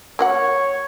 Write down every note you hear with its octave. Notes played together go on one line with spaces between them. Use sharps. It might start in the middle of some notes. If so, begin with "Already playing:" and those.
A#3 F#4 C#5 F#5